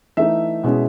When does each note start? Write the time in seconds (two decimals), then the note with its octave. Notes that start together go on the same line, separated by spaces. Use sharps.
0.17 E3 A3 D#4 E5
0.64 B2 G#3 C#4 E4